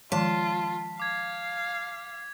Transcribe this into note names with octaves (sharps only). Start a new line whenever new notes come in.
D#3 F3 G#3 F4 A5 B6
F5 D6 G#6